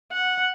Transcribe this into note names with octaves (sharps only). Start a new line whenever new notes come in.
F#5